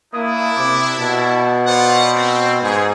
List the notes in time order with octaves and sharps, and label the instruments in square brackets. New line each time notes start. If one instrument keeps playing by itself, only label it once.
[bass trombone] A#3 [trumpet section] D4 E4 [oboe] D#6
[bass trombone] C3 [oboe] D6
[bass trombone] B2 [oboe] A5
[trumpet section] F4 D5 F#5 [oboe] C5
[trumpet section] C4
[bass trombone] G#2 [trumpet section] G#4